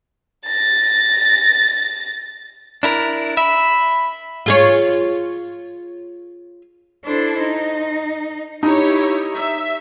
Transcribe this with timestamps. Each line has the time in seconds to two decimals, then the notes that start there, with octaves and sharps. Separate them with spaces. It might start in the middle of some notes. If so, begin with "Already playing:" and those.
0.45 A6 A#6
2.83 D4 E4 A#4
3.37 E5 B5
4.46 F4 G#4 C#5
7.05 D4 E4 A4 C5
7.39 D#4
8.63 D#4 E4 G4 C#5
9.34 E5